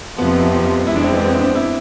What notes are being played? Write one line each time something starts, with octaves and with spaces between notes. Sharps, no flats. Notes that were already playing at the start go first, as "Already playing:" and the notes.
F2 C3 F3 B3
F2 E3 G#3 E4
D4
C4
B3
C4
D4
E4